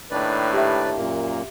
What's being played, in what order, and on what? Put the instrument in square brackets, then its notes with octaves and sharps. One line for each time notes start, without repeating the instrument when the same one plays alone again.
[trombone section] D#2 A2 D4 [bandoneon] B4 D5
[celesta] G4 E5
[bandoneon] F#2 A#2 A#3